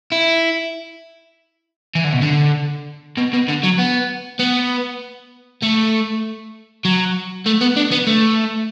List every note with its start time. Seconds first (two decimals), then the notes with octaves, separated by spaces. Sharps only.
0.12 E4
1.95 E3
2.04 D3
2.13 B2
2.22 D3
3.18 B2
3.33 B2
3.49 D3
3.64 F#3
3.79 B3
4.40 B3
5.62 A3
6.85 F#3
7.46 A3
7.61 B3
7.77 D4
7.92 B3
8.07 A3